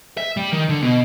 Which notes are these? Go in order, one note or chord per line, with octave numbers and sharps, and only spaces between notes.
E5
G3
D#3
D3
B2